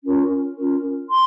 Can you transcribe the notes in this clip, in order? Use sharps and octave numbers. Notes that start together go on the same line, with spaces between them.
C#4 F4 A#4
C#4 F4 A#4
C6